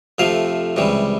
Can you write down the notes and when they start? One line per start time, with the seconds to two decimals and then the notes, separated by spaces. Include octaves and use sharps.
0.18 F2 C3 F3 A3 F5
0.76 C#2 C3 E3 G3